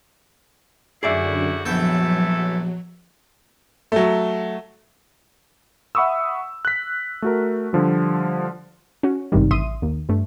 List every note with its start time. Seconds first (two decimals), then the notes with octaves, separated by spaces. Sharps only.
1.03 F#2 D3 G3 E4 F#4 G#4 D5 E5
1.65 A#1 E3 F#3 A3 B3 A4 G5
3.92 F#3 A3
5.95 E5 F#5 B5 C#6 D#6 E6
6.65 F#6 B6
7.22 A3 F#4 A#4
7.73 D3 F3 G3
9.03 C#4 F#4
9.32 G#1 G2 C3 D#3 G3
9.51 A1 E5 C6 D#6 D#7
9.82 D#2
10.09 G2 A3